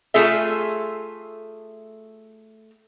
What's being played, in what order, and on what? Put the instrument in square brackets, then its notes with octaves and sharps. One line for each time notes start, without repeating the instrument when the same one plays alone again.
[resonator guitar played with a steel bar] A3 F4 G#4 A4 E5